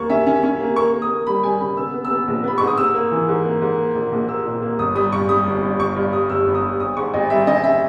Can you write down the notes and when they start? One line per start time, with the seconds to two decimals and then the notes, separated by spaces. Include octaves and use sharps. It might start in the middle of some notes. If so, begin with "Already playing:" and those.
Already playing: D#2 A#3 C#6
0.10 C#4 E5
0.26 C#4
0.43 C#4
0.60 A#3
0.76 A#3 C#6
0.93 A#3
1.02 D#6
1.10 A#3
1.27 G3 B5
1.43 G3 G#5
1.60 C#3 B5
1.77 B3 E6
1.94 B3
2.05 E6
2.11 B3
2.28 A#1
2.44 B3 B5
2.58 G#2 C#6
2.67 D#6
2.77 G#2 E6
2.95 A#3
3.11 E3
3.28 G#2
3.45 A#3
3.61 G#2
3.78 A#3
3.95 A#1
4.12 A#1
4.29 A#3 E6
4.45 A#2
4.62 A#3
4.79 G1 D#6
4.95 G3 D#6
5.12 G2 C#6
5.29 G3 D#6
5.46 G1
5.63 G2
5.79 G1 C#6
5.96 G2
6.13 G3 D#6
6.29 G1 E6
6.47 G1
6.55 D#6
6.63 G1
6.80 G#1 D#6
6.97 G#2 C#6
7.14 G#1 D#5
7.30 G3 E5
7.47 C#4 D#5
7.64 E5